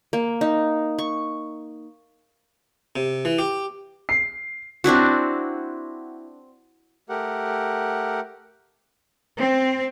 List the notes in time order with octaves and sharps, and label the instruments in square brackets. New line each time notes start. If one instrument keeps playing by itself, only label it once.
[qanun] A#3
D#4
C#6
[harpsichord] C3
E3
G4
[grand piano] C7
[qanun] C4 D4 E4 F#4
[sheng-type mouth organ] A3 G4 A#4 F#5
[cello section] C4